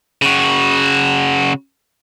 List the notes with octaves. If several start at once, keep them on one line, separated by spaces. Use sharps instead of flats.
C#3 F#4